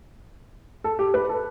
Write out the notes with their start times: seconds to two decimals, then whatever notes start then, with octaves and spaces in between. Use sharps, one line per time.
0.84 A4
0.99 G4
1.14 B4
1.29 A4